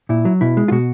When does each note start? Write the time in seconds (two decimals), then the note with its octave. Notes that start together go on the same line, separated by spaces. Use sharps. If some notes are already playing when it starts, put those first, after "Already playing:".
0.09 A#2 E4
0.25 F#3
0.41 B2 E4
0.57 G#3
0.68 F4
0.71 B2 F#4